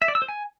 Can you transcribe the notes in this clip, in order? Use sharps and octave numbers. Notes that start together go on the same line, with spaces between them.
E5
D5
E6
C5
G#5